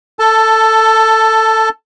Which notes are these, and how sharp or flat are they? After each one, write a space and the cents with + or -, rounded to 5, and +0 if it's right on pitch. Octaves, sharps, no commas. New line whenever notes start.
A4 +15 A5 +0